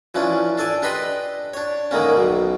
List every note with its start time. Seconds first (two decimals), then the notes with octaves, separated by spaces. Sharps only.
0.15 E3 F3 C#4 D4
0.58 D4 A4 D5 G#5
0.82 D4 G4 B4 D#5 B5 C6
1.54 D4 C#5
1.91 D3 D#3 G#3 A#3 C#4
2.16 B1 B2